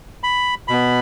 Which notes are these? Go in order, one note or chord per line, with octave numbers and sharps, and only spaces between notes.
B5
B2 B3 B5